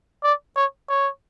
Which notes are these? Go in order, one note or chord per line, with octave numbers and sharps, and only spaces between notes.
D5
C#5
C#5